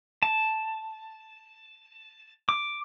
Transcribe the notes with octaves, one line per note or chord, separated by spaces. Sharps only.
A5
D6